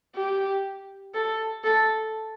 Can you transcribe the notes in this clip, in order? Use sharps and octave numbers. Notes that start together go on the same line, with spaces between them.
G4
A4
A4